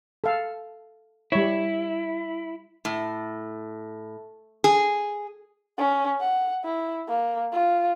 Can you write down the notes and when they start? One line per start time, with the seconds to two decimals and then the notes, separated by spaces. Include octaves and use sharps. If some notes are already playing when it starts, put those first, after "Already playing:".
0.24 A4 F5
1.32 G3 E4 C#5
2.85 A2
4.64 G#4
5.78 C#4
6.20 F#5
6.64 E4
7.08 A#3
7.52 F4